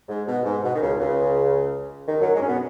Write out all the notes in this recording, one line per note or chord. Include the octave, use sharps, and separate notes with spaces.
G#2
B2
G#2
B2
D#3
C#2 C#3
C#2 C#3
D#2 D#3
F#2 F#3
G#2 G#3
C#4
B2 B3